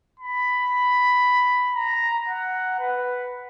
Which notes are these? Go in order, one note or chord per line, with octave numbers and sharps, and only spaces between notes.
B5
A#5
F#5
B4